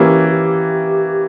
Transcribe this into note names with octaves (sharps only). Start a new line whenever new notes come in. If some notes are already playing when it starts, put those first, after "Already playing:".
Already playing: E3 A#3 C#4 E4 G4
G4